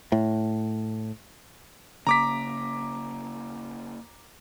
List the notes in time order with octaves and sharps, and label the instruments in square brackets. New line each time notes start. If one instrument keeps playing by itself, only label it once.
[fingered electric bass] A2
[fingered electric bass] C#3 A#3 [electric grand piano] A#5 D6 B6